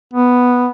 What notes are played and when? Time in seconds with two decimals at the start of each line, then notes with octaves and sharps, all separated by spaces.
0.14 B3